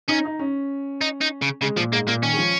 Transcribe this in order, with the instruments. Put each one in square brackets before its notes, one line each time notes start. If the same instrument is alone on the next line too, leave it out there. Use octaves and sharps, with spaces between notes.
[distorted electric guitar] C#4 [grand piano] D#4
[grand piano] D#4
C#4
[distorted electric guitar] D#4
D#4
C#3
[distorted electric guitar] C#3 [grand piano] G#3
[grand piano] A#2 [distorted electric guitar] F3
[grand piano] G#2 [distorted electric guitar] A#3
[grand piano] A#2 [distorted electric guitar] A#3
[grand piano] D#3 [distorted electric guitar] C#4
[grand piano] G#3
F3